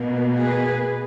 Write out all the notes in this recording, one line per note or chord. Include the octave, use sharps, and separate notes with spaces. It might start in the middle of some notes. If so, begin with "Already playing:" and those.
Already playing: B2 A#3
G#4 B4